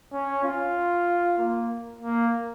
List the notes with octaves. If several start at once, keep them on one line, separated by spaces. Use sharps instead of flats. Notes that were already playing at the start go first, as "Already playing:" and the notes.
C#4
F4
A#3
A#3